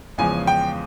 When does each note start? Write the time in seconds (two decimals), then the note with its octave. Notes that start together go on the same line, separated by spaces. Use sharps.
0.18 E2 C#3 F3 G#3 G#5
0.47 G5